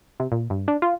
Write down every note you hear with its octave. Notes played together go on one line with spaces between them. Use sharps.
C3
A#2
G2
D4
F4